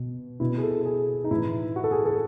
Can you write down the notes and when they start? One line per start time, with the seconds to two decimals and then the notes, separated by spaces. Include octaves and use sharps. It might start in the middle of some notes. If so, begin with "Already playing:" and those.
Already playing: B2
0.40 B2 E4
0.58 G#4
0.63 A4
0.85 G#4
1.24 D#4
1.31 A2 E3 E4
1.76 F#4
1.84 A4
1.91 G#4
2.05 A4